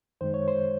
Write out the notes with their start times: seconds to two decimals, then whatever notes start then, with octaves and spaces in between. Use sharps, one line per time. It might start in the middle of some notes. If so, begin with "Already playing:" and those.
0.21 F#2 D#3 G#3 C5
0.34 C#5
0.48 C5